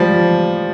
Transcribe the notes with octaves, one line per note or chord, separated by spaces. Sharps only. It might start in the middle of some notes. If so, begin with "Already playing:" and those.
Already playing: F3 G3